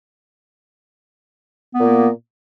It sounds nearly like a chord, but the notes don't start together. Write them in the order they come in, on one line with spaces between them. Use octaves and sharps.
B3 A#2 A#3